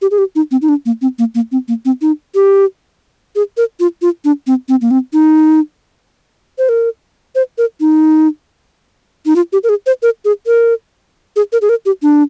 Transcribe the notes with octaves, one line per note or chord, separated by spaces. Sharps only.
G4
G#4
G4
D#4
C4
D#4
D4
A#3
C4
A#3
A#3
C4
A#3
C4
D#4
G4
G#4
A#4
F4
F4
D4
C4
C4
A#3
C4
D#4
C5
A#4
C5
A#4
D#4
D#4
F4
G4
A#4
G#4
C5
A#4
G#4
A#4
G#4
A#4
G#4
A#4
G4
D4